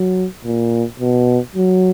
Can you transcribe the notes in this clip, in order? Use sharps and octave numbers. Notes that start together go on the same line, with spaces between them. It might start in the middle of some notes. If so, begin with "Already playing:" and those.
Already playing: F#3
A#2
B2
F#3